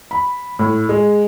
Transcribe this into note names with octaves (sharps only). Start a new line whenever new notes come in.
B5
A2
G#3